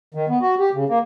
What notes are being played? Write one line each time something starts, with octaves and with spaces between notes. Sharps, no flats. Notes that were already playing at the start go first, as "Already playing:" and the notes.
D#3
B3
F#4
G4
C#3
A#3